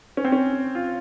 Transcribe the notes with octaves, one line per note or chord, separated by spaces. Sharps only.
C#4
C4
C#4
F4